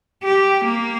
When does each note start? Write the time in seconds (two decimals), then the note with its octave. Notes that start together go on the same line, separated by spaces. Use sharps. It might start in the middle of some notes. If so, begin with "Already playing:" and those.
0.24 G4
0.65 A#3